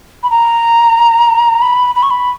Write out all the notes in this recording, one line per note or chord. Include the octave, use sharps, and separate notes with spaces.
B5
A#5
B5
B5
C#6
B5